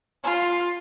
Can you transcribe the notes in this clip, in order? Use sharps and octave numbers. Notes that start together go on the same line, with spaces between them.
F4